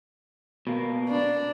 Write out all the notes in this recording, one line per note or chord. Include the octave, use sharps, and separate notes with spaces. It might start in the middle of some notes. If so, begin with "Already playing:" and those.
B2 A#3
D4